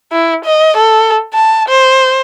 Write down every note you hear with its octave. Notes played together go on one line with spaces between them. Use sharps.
E4
D#5
A4
A5
C5